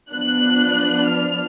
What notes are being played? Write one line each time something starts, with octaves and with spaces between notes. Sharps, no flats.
F3 B3 D4 F#6
F6